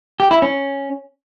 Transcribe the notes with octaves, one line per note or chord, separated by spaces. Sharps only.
G4
E4
C#4